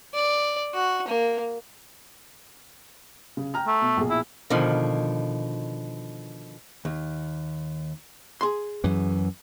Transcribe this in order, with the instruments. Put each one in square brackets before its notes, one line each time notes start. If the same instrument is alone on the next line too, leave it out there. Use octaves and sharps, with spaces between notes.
[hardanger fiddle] D5
F#4
A#3
[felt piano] C#3
G5 A#5 F6
[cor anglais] A3
[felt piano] B2
A#1 B2 G#4
[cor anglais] E4
[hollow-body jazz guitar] B2 D3 D#3 F3
D#2
G#4 C6
[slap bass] F#2 E3